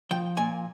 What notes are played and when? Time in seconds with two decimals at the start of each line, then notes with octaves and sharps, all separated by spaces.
0.11 F3 G5
0.37 A#2 G#5